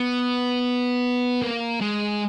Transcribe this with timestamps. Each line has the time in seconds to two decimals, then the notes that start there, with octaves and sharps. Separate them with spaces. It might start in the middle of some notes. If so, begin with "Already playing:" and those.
Already playing: B3
1.42 A#3
1.81 G#3